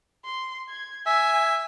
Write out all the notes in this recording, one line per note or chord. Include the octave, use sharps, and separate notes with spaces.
C6
G#6
E5 G#5